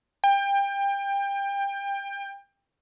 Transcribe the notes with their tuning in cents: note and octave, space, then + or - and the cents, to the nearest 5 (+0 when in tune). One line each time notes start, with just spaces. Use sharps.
G5 +25